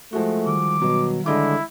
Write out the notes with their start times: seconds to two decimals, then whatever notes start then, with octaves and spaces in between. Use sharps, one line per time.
0.13 F3 G#3 A3 F#4
0.47 D#3 G3 D6
0.82 B2 F#3
1.26 D3 G#3 E4 D#5 D6